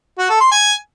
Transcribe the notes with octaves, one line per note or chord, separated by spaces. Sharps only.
F#4
A4
C6
G#5